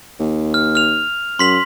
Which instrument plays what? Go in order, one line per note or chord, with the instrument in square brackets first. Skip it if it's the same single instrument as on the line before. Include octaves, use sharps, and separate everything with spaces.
[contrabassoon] D#2
[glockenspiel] F6
F6 F7
[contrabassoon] F#2 [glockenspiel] C6 B6 F#7